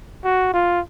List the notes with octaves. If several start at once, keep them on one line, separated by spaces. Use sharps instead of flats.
F#4
F4